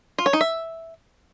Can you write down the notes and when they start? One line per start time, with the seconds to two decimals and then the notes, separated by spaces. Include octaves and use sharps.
0.18 F4
0.26 C#5
0.33 D#4
0.41 E5